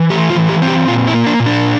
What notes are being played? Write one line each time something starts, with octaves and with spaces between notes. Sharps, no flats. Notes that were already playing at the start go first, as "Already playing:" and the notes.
Already playing: E3
A3 G4
F4
E3
G4
C4
G4
A#2 F4
E4
A#3
D4
A#2
D4